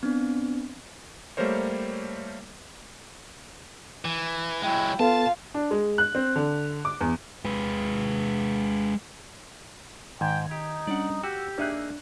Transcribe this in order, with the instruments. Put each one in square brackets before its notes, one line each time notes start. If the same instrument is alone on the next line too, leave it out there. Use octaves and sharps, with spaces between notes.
[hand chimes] B3 C4 D4
[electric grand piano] G3 A3 A#3 A#4 C5 C#5
[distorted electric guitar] E3
[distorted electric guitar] F#3 G#3 [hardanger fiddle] E4 G5
[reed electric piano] B3 A4 [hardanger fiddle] F4 F5 [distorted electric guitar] A5
[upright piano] D4
G#3
F#6
C4
D3
D6
E2
[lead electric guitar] G#3 B4
[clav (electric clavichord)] G#2 [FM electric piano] D#3 G#6 [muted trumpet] G5
[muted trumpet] D#4 [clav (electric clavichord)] G4
[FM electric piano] G3 C#4 D4 [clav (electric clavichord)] D5 F#5
[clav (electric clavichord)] F#4 [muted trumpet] G4 [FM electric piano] E6
[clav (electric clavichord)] A#3 D#4 G#4 [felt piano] D4 E5 F#6